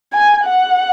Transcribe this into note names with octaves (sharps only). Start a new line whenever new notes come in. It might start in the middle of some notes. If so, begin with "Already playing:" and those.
G#5
F#5